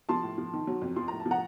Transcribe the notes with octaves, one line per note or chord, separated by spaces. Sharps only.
F3 A5 C6
A2
F3
D#3
F#3
F2
F3 C6
A2 A#5
A5
F3
F#5 A#5